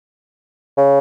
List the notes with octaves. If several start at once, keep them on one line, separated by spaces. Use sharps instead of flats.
C#3